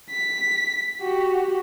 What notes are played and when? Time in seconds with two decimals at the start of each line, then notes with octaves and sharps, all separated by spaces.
0.11 B6
1.01 F#4 G4